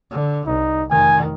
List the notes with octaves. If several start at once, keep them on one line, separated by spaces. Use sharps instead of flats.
D3
C2 D#4
F1 D#3 G#5